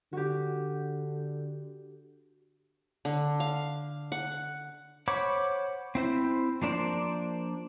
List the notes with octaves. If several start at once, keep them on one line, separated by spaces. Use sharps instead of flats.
D3 F#4 G4
D3
F5
F#5
C5 C#5 F#5 B5 D6
C4 E4 C5
F3 A#3 D4 C5 D5